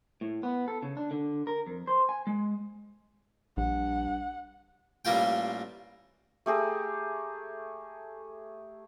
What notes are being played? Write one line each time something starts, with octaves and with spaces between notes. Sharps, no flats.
A2
B3
A4
C#3
D4
D3
A#4
F2
C5
G#5
G#3
A#1 G2 F#5
A1 G3 A#3 F4 G5
A3 G4 G#4 A#5